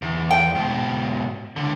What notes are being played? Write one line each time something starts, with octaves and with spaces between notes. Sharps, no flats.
E2
G5
G#2 B2
C#2 D3